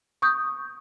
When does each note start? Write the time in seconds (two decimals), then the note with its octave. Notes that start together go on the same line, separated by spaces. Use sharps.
0.22 C#6 D#6 G6